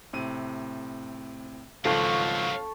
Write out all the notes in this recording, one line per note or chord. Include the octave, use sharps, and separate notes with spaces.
A2 C3 D#7
G#1 C#2 G2 F3 F#3 A4 F5 C#6